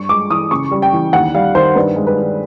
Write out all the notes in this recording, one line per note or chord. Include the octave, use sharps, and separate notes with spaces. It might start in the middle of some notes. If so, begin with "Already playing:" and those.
Already playing: G2 C#6
G#3 D6
E3 D#6
C#3 C#6
G3
G5
E3
D#2 F#5
G3 F5
D#3 C5
G2 B4
G#3
B4
D#3